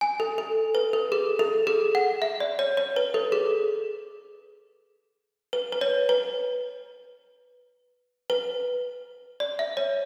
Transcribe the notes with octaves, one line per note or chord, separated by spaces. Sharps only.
G#5
A4
A4
B4
A4
G#4
A4
G#4
F#5
E5
D5
C#5
C#5
B4
A4
G#4
B4
B4
C#5
B4
B4
D5
E5
C#5